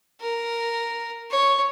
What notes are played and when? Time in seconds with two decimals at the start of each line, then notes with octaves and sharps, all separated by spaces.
0.21 A#4
1.31 C#5